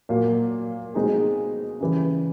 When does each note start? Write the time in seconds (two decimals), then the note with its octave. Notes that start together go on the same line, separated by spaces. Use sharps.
0.09 A#2 F#3 A#3
0.94 B2 G#3 C4 D#4 G#4
1.81 C#3 E3 G3